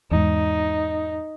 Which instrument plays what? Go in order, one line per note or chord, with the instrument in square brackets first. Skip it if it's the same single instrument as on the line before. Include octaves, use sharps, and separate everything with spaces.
[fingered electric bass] E2 G#2 [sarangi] D#4